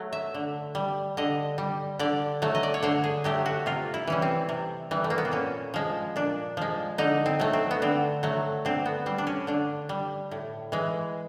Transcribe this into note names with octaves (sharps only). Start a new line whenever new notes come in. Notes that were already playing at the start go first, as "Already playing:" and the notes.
Already playing: F#3 A3
E5
D3
G3
D3 D#5
G3
D3 D5
F#3 A3
D#5
D5
C#5
D3 C5
G#4
F#3 A3 G4
F#4
C3 F4
E4
E3 G3 C#4
C4
C3
E3 G3
A3
A#3
B3
C4
A#2 C#4
F3 G#3
A#2 D4
F3 G#3
D3 D#4
C4
F#3 A3
C4
B3
D3 C4
F#3 A3
D3 C4
B3
G3 C4
D4
C#4
D3 D4
G3
A2
E3 G#3